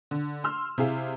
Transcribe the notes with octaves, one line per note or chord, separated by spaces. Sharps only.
D3
C6 E6 F6
C3 E4 G#4 F5